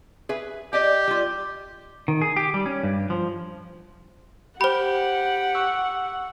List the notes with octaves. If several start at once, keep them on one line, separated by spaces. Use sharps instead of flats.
G#4 B4 E5
G4 D5 D#5 G5
G3 F4
D#3
G#4
G4
G3
C#4
G2
F3
G4 C5 F#5 B5
C#6 E6 F#6